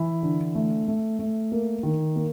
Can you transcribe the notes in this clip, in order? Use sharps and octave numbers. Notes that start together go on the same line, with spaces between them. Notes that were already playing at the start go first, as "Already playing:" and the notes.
Already playing: E3 E4
D3
A3
A3
A3
A#3
D#3
A#3